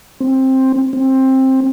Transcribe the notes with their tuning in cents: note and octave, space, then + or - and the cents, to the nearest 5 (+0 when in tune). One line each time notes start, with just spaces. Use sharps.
C4 +10
C4 +15